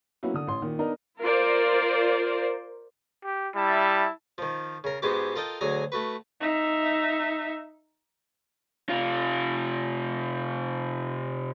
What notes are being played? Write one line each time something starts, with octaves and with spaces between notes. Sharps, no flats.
F#3 A#3 B3 C#4 E4 F#4
D3 D#6
A1 C6
A#2 D#3
B3 D4 D#4 A#4
F4 A#4 C5 D5
G4
G3 E4 E5 A5
D#3 F3
C#3 A#4
G#2 G#3 B3 F#4 G4 D6
F4 A4 A#4 D#5 G5
D2 F#3 G#4 G#5 A#5
A3 F#4 B4
D#4 E5
C3 F4